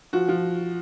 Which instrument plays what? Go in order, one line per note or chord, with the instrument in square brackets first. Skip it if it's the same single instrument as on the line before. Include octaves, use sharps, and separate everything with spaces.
[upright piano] F3 F#4
F3